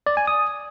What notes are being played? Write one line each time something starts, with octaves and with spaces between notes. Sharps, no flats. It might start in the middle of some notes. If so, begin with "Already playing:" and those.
D5
G#5
D#6